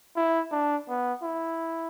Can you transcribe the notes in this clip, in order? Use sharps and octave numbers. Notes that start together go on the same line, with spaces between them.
E4
D4
B3
E4